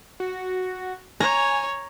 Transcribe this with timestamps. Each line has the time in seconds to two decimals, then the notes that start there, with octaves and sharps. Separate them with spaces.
0.20 F#4
1.20 C#5 G#5 A#5